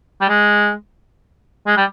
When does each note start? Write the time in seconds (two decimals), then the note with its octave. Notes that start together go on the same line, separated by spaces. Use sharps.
0.21 G3
0.29 G#3
1.67 G#3
1.77 G3